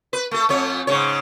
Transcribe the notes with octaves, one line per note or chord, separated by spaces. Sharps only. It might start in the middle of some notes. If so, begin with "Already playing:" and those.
B4
A3 A4
F2 A3 C#5
G#2 C#3 C#5